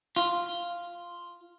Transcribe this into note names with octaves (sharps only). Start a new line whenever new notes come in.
F4